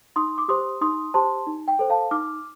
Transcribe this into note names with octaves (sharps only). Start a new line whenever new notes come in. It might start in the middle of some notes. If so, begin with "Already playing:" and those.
D#4 C6 D#6
D6
G4 C5 C6 D#6
D#4 C6 D#6
G4 C5 A5 C6
D#4
G5
A4 C5
F5 A5
D#4 D6 F6